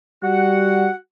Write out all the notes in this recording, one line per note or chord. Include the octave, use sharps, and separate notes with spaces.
G3 F#4 F#5